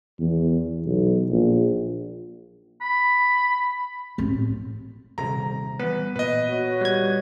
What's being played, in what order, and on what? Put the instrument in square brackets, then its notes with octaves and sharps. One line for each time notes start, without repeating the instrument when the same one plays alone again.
[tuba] E2
B1
A#1
[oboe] B5
[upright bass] A1 C4
[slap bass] D#1 C3 G3 [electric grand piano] A#5
[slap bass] E3 G3 [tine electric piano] B3 [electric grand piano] B4
[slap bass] A#2 [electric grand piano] B4 D#5
[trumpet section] F#4 C#5
[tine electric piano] G3 G#6